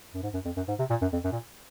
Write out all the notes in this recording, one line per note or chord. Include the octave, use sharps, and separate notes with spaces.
F#2
G#2
F#2
F2
F#2
G#2
C3
A#2
F#2
F2
F#2
A#2